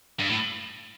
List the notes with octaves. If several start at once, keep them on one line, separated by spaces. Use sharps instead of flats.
G2
A2